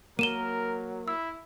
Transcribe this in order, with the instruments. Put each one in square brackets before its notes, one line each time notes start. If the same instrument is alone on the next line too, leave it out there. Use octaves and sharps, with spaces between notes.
[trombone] F#3 [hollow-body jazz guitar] A#3 [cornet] A#4 [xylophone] D#7 E7 G7
[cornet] E4 [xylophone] E6